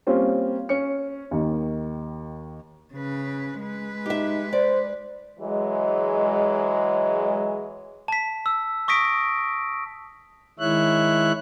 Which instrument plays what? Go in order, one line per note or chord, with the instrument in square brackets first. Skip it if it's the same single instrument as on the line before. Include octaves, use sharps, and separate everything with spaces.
[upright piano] G3 A#3 C4 C#4 F4
C#4 C#7
D#2 D#3
[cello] C#3 B4
G#3 B4
[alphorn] D#4 [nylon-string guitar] G4 E5
[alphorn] C5 [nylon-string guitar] D5
[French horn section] E3 F#3 G#3
[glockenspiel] A5 B6
E6
C#6 D#6 A#6 B6 D7
[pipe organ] D#3 G#3 E4 C#5 E5 F#6